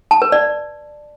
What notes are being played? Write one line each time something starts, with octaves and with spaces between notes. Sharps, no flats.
A5
B4
D5